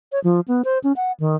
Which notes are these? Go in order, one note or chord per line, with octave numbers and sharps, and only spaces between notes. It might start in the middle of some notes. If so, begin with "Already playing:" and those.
C#5
F3
B3
C5
C#4
F#5
D#3